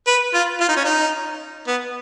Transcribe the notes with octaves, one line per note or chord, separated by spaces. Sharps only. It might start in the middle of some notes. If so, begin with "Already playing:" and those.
B4
F4
F4
D#4
C#4
D#4
B3